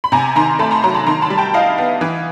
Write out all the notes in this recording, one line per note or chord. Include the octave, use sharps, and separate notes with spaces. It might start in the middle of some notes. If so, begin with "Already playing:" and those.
B5
C3 G#5 A#5
D#3 A#5 C6
A3 A5 B5
A#5 C6
F#3 A#5 C6
A5 B5
D#3 A#5 C6
A5 B5
G3
G5 A5
E4 D#5 F5
B3
E3